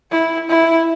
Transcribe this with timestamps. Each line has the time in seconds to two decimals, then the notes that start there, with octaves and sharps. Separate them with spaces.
0.11 E4
0.49 E4